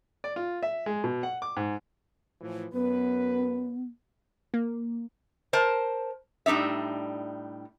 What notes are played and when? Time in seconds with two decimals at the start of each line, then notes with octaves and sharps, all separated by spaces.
0.24 D5
0.36 F4
0.63 E5
0.86 G#3
1.04 B2
1.23 F#5
1.42 D6
1.57 G#2
2.41 A2 E3 F3
2.73 F#2 B3 B4
4.54 A#3
5.53 A#4 C5 A5
6.46 A2 G3 D4 D#4 E5